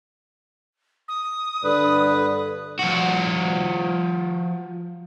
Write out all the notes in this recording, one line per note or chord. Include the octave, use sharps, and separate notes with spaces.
D#6
G2 D3 A4 B4 D5
F3 F#4